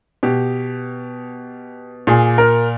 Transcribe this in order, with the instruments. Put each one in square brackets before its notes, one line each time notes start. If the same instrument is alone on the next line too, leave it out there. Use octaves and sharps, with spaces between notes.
[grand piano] B2 G4
A#2 G#4
A#4